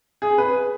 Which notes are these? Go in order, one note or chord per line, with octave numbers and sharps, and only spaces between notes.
G#4
B4